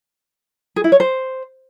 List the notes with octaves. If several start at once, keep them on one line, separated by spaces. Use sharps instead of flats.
G#4
E4
C#5
C5